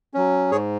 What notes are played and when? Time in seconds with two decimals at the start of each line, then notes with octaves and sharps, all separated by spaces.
0.14 F#3 C#4
0.51 G#2 G#4 C#5